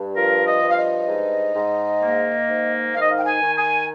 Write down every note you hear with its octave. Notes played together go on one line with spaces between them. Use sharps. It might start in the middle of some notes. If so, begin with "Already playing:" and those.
Already playing: G2
F3 A#4
D#5
G2
F5
D#5
G#2
G#2
A#3
G#2
D#3 F5
D#5
F5
G5
G#5
D#3
G#5